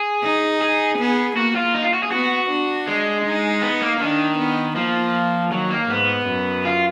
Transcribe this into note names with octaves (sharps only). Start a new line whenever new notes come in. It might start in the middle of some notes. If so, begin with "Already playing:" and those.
Already playing: G#4
D#4
G#4
B3
A#3 F#4
F4
D#4
F4
F#4
G#4
B3 F#4
D4
G#3
D#4
B3
A#3
D#3 D4
B3
F3 A#3
D#3 F#3
A#3
G#2 B3
F#2
F4